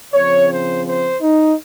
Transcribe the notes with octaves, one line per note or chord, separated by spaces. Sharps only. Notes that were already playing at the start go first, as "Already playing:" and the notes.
C#3 F3 C4 C#5
C5
C5
D#4